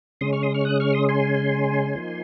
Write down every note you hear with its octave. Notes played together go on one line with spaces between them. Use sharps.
C#3 G#3 C#4 C6 D#6
C#6 F6
C6 D#6
C#6 F6
D#6 F#6
C#6 F6
C6 D#6
G#5 C6
F3 A#3 D#4